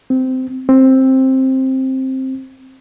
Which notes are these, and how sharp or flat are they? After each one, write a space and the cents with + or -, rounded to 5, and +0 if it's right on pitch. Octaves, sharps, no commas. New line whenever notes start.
C4 -15
C4 +10